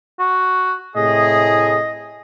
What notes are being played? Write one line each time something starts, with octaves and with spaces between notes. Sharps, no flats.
F#4
A2 C3 G#4 D#5